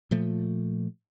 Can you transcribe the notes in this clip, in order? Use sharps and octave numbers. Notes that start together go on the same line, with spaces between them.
A#2 F3 A3